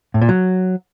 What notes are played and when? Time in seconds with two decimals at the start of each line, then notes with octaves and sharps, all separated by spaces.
0.14 A2
0.21 A#2
0.29 F#3